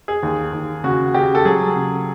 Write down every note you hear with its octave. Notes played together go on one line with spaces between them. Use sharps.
G#4
D#2
D#2
C#3 F#4
C#3 G4
A4
F#3 G#4
C#3